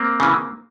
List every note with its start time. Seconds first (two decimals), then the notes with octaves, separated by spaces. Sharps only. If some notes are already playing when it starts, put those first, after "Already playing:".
Already playing: A#3 C4
0.20 C#3 E3